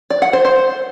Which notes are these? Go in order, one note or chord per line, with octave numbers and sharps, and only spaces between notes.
D5
F#5
C5
C5